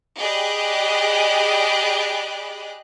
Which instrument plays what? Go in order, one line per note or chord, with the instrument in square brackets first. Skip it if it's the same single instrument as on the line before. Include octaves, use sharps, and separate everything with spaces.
[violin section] G4 G#4 D5 D#5 B5 F#6